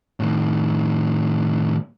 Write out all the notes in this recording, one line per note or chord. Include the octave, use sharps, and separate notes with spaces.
A2 D#3